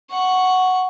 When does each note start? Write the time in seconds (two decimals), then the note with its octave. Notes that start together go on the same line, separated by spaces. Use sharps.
0.11 F#5 C#6